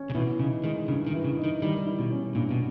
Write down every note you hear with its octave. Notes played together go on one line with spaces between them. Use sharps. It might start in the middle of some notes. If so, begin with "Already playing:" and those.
Already playing: C#4
C#3
B2 E3
C#3 D#4
D#3 G#3
G2 C#3
D#3
E3
C#3
D#4
D#3
D#3 G3
E4
B2
C#4
G2 A#2
B2